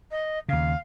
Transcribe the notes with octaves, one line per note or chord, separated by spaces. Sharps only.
D#5
D#2 C#3 F5